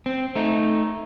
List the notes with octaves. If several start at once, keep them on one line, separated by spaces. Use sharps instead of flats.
C4
A3 D#4